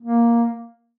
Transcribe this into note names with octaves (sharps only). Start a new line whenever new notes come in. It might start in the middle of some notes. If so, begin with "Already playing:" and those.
A#3